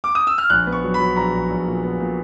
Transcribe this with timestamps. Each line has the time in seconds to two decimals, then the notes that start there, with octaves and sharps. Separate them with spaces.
0.04 D6
0.15 D#6
0.27 E6
0.38 F6
0.50 A#1 F#6
0.67 B3
0.72 C#6
0.84 F#3
0.94 B5
1.00 F#3
1.16 A#1 A#5
1.34 A#1
1.50 A#1
1.67 A#2
1.83 B3
2.00 A#2